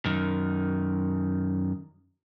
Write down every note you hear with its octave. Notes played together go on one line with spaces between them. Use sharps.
F#2 D#3